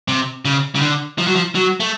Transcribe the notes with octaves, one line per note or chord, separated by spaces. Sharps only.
C3
C#3
C#3
D3
F3
F#3
F3
F#3
A3